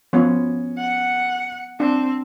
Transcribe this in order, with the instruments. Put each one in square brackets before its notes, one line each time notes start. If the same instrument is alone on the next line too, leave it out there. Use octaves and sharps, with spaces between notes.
[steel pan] F3 B3 [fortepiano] C#4
[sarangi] F#5
[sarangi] C4 [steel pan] D4